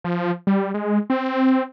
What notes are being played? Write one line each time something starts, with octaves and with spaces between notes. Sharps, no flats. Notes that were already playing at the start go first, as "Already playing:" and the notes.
F3
G3
G#3
C4